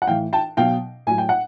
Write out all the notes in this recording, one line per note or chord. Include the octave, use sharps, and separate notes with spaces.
F#5
A2 E3 F5 G5
G5 A5
B2 F#3 F5 G5
A2 F#3 G#5
G5
F#5